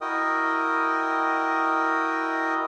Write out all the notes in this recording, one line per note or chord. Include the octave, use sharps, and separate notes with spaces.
E4 F#4 A#4 D#5 G5 D#6